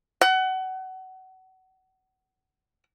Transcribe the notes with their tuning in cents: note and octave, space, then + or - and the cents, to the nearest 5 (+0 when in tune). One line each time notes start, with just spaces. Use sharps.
F#5 +25